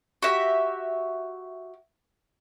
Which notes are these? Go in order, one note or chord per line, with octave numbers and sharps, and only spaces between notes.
F#4 G4 E5